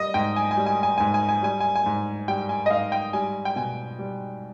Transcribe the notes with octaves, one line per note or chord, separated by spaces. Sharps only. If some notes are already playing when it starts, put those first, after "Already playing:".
Already playing: G3 D#5
G#2 G5
G#5
G#5
G3
G#5
G#5
G#2 G#5
G#5
G#5
G3 G#5
G#5
G#5
G#2
G3 G5
G#5
D#5
G#2 F5
G5
G3 G#5
G5
B2 G#5
G3